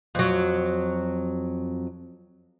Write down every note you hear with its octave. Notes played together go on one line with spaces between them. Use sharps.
F2 F#3